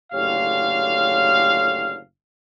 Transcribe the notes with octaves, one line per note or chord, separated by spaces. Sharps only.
F#1 A2 D3 G4 C#5 F5